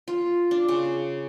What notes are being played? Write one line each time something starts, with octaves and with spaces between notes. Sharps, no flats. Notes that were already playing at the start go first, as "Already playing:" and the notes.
F4
D4
C#3